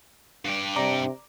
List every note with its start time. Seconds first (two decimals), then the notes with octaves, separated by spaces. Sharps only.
0.45 G2 G4
0.76 C3 D5 A#5 D6